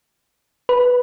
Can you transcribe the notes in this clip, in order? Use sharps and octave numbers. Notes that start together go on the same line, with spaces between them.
B4